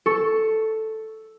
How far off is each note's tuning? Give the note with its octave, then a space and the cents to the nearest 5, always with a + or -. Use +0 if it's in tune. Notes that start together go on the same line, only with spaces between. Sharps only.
A4 +0 C#6 +0